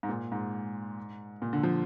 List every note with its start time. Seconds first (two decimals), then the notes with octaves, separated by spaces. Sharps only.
0.03 G#2
0.09 A#2
0.32 G#2
1.42 A#2
1.53 D3
1.63 F3